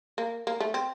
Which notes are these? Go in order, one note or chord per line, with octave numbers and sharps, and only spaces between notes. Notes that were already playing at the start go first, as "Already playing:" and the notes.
A#3
A#3
A3
C4